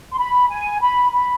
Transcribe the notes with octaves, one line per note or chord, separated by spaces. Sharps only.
C6
B5
G#5
B5
B5